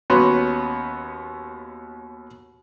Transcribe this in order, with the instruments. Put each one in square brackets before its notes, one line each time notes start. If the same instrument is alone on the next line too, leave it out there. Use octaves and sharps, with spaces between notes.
[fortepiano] D#2 B3 C#4 F#4 C6